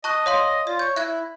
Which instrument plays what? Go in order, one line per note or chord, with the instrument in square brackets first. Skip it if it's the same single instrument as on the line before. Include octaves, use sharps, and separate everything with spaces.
[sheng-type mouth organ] D#5 [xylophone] A5 C#6 F#6
[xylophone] C#5 F5 C6
[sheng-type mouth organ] F4 [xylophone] D5
[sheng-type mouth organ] C#5 [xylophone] G6
[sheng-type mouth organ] E4 [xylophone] E5 F#6 G#6